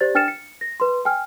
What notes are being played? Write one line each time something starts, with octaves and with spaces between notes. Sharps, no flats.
G4 C5 D5 A6
D4 G5 F6 A6 C#7 E7
C#7
A#6
B4 C6
G5 G#5 F6